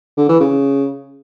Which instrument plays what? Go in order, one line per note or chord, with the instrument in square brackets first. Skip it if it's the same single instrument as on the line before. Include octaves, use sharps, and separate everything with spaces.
[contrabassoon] D3
E3
C#3